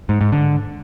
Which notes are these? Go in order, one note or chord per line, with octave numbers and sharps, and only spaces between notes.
G#2
G#2
D3